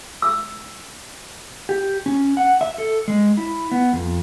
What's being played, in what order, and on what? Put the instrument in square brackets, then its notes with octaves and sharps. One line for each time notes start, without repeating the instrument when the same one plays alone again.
[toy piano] E6
[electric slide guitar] G4
C#4
F#5
E5
A4
G#3
E4
B3
F2